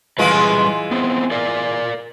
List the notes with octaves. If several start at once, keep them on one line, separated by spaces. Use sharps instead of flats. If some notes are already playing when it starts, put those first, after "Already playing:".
E3 G3 G#3 F4 G#4 B4
B3 C4
A#4 D5 F5